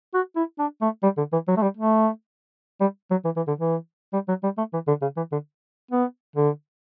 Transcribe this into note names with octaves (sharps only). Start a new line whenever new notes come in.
F#4
E4
D4
A3
G3
D3
E3
F#3
A3
G3
A3
G3
F#3
E3
E3
D3
E3
G3
F#3
G3
A3
E3
D3
C#3
E3
D3
B3
D3